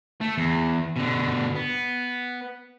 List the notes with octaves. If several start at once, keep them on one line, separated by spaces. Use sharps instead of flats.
A3
E2
B2 D3
B3